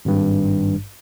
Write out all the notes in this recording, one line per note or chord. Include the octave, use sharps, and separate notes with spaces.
G#1 G2